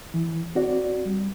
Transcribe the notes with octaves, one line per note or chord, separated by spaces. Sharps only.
E3
C4 F#4 D5
G3